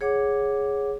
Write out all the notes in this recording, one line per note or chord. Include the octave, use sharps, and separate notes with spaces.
G#4 C#5 F#5 D6